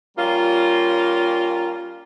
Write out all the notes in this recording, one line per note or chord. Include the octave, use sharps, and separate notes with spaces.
G3 A#3 C#4 F4